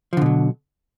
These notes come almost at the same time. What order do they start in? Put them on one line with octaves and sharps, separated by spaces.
F3 D3 B2 F#3